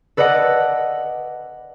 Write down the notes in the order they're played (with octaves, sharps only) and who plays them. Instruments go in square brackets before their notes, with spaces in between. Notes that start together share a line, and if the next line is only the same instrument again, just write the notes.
[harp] A4 B4 D5 D#5 F#5